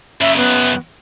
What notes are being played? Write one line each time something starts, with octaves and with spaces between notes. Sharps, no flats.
F#2 C#3 E5
B3